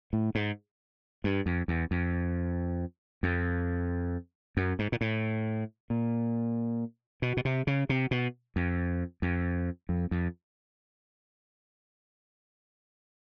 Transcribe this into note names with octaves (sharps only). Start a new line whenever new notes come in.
A2
G#2
G2
F2
E2
F2
F2
F#2
G#2
A#2
A2
A#2
B2
B2
C3
C#3
C3
B2
F2
F2
F2
F2